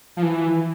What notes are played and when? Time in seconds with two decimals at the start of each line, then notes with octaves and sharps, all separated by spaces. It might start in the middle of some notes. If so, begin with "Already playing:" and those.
0.17 F3
0.23 E3